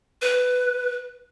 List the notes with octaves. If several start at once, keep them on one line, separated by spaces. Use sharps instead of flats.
B4